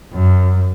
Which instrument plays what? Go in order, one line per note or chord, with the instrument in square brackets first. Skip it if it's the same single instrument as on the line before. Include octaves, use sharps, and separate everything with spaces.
[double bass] F#2